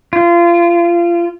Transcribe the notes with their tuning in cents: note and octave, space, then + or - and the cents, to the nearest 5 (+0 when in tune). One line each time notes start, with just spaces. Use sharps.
F4 -25